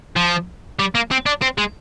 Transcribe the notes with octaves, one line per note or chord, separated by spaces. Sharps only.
F3
G3
A#3
C4
D4
C4
G#3